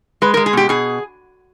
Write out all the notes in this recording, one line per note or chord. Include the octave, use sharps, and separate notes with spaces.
G#3 B4
A#4
G#3
G#4
B2 G4
B2 G#4